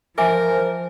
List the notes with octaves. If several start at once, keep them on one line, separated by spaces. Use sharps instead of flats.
F3 A#4 C5 E5 G#5 D6